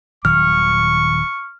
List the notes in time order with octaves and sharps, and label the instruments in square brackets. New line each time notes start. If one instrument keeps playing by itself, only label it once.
[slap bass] D#1 D#3 F#3 [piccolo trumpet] C#6 [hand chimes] F6